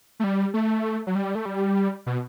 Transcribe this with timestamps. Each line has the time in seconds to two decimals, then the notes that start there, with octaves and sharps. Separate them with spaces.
0.20 A3
0.24 G3
0.54 A3
1.07 F#3
1.15 G3
1.35 A3
1.45 G3
2.06 B2